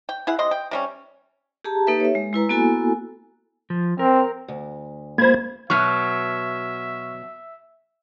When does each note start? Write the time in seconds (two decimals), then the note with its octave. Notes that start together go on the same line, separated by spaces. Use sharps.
0.09 G5
0.27 E4 G#4 F#5
0.39 C3 D#5 C6
0.51 G5
0.71 C3 G3 C#4
1.64 G4 G#4 A5 A#5
1.87 A#3 D#4 G4 A4 B4 E5
2.00 C#5 E5
2.15 G#3
2.33 G#3 E4 B4 A#5
2.50 A#3 B3 E4 F#4 A4 G#5
3.70 F3
3.99 C4 A#4
4.48 D2
5.18 G#3 A#3 F4 C5 B5 G#6
5.70 B2 F#3 E5 C#6 F6